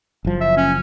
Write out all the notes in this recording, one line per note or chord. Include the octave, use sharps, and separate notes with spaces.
F#1 F3
E5
C#4